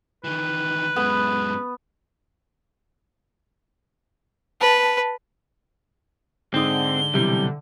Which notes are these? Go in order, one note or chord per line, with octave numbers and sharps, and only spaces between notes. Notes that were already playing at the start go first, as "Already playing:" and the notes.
D#3 E3 B4
F#2 G#3 B3
B4 A5
G#2 D3 C4 D#4 D#6 G7
B1 C3 E3 G3